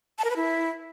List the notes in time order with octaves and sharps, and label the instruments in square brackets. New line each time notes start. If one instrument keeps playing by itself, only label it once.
[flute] A5
A#4
B4
E4